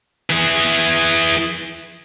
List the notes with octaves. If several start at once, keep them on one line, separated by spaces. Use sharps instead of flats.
E3 G#4